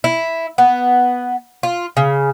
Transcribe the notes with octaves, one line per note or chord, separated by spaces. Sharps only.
E4
B3
F4
C#3